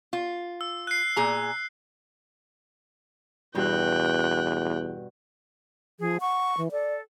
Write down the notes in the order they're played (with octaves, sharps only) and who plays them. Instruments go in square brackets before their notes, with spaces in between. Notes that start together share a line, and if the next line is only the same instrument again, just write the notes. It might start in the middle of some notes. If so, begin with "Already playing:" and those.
[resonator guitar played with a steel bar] F4
[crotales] E6
F#6 C7
[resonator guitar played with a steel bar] A#2 G#4 A#5
[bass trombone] E2 [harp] G2 B2 [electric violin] G5 F#6
[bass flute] F3 [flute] G#4
[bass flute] F#5 [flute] C#6
[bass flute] E3
[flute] A4 [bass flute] D5